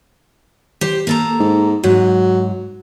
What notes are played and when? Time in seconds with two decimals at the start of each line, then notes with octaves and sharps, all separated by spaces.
0.81 G4 C5
1.07 A#3 A4 A#5
1.39 G#2
1.84 G#2 F#3